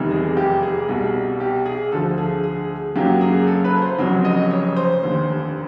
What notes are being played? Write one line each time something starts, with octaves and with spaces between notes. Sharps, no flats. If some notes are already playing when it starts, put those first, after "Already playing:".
Already playing: F1 E2 C3 D#3 G3
G#4
G4
G#4
C2 B2 G3
G4
G#4
D2 D3 F3 A4
G#4
G#4
F#2 C#3 F#3 A#3 G4
G#4
A4
B4
C5
F1 F2 C#3 F#3
D#5
C#5
C5
F1 D#2 D3